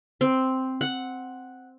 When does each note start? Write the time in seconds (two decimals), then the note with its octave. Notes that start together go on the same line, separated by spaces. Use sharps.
0.21 C4
0.81 F#5